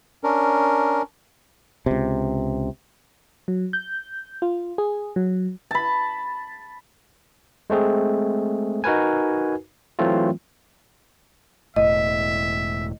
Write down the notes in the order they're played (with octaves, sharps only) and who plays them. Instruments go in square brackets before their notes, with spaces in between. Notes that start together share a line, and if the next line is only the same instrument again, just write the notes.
[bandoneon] C#4 D4 A#4
[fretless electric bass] C#2 C3
[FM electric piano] F#3
G6
F4
G#4
F#3
[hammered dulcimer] A5 B5
[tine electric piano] G#3 A3 C4 G#4
D#4 F#4 A#4 B4 G#5
E3 F#3 A3 C4 F4
[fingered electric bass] E1 A2 [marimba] D#5 [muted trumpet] E5